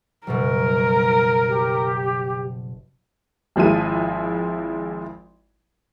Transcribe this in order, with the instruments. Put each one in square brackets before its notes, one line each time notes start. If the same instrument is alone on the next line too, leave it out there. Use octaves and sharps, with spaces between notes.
[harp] F#1 B2 G3 [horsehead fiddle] A#4
[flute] G4
[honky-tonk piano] G#1 F3 G#3 E4 D#7